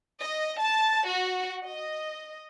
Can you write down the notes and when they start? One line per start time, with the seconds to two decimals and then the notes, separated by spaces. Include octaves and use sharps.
0.21 D#5
0.61 A5
1.08 F#4
1.66 D#5